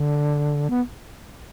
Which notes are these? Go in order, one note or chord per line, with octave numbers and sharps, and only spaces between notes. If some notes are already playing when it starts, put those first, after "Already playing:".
Already playing: D3
B3